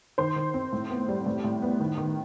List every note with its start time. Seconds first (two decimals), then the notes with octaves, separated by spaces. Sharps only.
0.18 D#3 C5 C6
0.36 D#3
0.54 C4
0.72 A2
0.90 B3
1.08 G3
1.26 A2
1.44 A2
1.62 B3
1.80 D#3
1.98 D#3